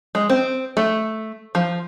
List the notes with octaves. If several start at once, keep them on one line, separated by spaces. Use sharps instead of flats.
G#3
C4
A3
F3